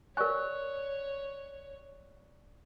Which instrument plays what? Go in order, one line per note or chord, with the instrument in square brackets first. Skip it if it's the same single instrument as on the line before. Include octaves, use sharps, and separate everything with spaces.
[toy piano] A#4 G#5 [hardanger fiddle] C#5 [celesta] D5 C#6 F#6